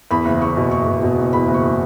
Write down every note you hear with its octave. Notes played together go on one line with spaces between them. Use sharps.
E2 B5
F#1
F#1 C#6
B2
F#1 C#6
B2
B2
F#1
E2 B5
F#1
C#6